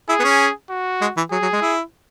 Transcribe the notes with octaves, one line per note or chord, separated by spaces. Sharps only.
E4 G#4
B3
C#4
F#4
G#3
E3
F#3 G#4
F#3
G#3
E4